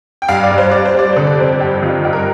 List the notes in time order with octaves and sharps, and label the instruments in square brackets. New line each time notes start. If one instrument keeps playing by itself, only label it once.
[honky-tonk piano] G5
G2 F5
D5
G2
C5
G3 D5
C5
G3 D5
D3 C5
D5
F2 C5
G2 G4
D#3 F4
G2 G4
A#4